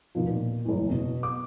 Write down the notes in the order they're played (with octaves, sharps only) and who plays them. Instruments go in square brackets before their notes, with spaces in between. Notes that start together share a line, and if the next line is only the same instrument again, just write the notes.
[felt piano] D#2 B2 F3
A#2
F#1 E2
B2
D6